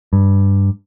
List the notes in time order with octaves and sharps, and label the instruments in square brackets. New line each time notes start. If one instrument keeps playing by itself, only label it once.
[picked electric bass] G2